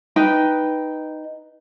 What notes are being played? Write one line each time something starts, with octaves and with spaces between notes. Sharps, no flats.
D#4 B4 G5